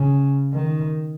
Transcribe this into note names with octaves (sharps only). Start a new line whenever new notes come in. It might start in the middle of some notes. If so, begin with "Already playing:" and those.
Already playing: C#3
D#3